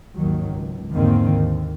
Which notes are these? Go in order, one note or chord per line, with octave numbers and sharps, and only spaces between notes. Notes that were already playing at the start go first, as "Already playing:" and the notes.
G#1 D#2 D#3 F#3
C#2
E2 G#2 D3 D#3 A#3 C4
D#2